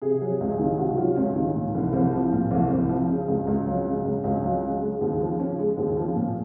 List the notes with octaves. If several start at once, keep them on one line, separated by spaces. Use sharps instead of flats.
C3 G#4
F#3
C#2
D#3
C3 F#4
F#3 F4
C#2 C#4
D#3
A#2
C2
C2 C4
F3
A#2
C2
C2 C4
F3
C#3
C#2
C#2
F#3
C#3
C#2
C#2 C#4
F#3
C#3
G#3
D#2
F3
C#3 C#4
G#3
D#2
F3
A#2